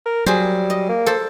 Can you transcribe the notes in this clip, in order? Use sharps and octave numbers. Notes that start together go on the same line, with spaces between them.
A#4
F#3 G3 G#4 C5
D#5
A#3
A4 C5